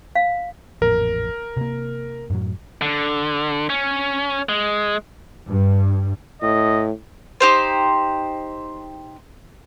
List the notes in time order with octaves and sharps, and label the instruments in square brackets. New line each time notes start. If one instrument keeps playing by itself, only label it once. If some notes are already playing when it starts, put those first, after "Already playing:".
[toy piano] F5
[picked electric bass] A1 F2 A#2 [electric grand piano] A#4
[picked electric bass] C3 A#3
F#2 A2 F#3
[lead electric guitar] D3
C#4
G#3
[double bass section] G2
[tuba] A2 [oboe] D#5
[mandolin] D#4 G4 C5